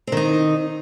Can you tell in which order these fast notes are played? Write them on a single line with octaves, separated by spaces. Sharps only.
C4 D#3 D#4